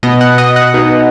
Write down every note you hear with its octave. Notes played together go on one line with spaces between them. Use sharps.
B2 B3 D#5
F#5
D#5
F#5
B2 B3 D#4